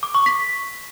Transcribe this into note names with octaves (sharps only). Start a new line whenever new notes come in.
D6
C#6
B6